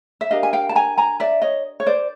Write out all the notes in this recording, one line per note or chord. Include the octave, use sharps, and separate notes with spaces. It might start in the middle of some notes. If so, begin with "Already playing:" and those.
E5
D4 G4 A#4 D#5 F5
G#5
F5 G5
A5
G#5 A#5
G#5 A#5
D5 E5
C#5 D#5
C#5
C5 D5